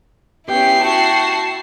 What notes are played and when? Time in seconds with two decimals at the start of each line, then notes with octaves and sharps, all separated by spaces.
0.48 B3 C#4 E4 G4 G5 C7
0.81 F#4 G5 A5